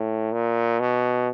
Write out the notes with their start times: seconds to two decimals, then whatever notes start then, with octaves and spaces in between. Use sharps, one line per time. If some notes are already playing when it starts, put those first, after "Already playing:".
Already playing: A2
0.33 A#2
0.80 B2